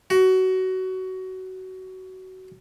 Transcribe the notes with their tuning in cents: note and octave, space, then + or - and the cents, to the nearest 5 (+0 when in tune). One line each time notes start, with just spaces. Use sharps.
F#4 +20